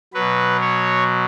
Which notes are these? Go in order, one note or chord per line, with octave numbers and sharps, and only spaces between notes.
B2 F#3 B4
C#5